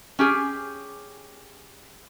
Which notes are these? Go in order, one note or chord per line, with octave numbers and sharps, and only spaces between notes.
C#4 G4 G#4